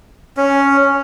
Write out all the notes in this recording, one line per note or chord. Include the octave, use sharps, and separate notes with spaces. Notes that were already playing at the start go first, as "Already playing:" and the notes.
C#4